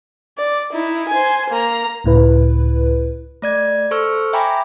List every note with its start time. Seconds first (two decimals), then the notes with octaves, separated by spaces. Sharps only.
0.38 D5
0.72 D#4 E4
1.09 C5 G#5
1.50 A#3 A#5
2.04 C#2 A2 E4 B4
3.42 A3 D5 G#6
3.91 A4 C5 C#6 E6 F6
4.33 E5 G5 G#5 A#5 B5 D6